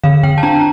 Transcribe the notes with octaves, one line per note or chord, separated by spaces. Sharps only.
D3 F5
D3 G5
A5
D4 A#5